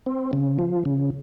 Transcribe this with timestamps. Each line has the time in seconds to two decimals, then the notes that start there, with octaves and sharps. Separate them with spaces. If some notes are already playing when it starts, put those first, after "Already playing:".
0.06 C4
0.33 C#3
0.59 F3
0.85 C#3